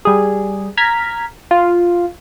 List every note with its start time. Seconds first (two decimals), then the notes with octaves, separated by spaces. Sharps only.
0.05 G3 G#4
0.77 A#5 F6 G#6 B6
1.51 F4